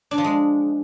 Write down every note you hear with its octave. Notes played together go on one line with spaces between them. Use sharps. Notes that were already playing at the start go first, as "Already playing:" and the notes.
D4
F3
G#3